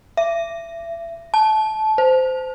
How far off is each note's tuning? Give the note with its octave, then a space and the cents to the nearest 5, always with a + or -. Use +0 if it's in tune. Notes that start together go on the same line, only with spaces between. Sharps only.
E5 +30
A5 -20
C5 -20